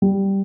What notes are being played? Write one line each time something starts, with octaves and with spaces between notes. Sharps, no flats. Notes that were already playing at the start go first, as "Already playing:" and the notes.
G3